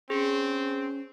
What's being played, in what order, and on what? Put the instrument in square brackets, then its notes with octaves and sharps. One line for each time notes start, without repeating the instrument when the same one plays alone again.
[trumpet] C4 [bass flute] C#4 [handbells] G#4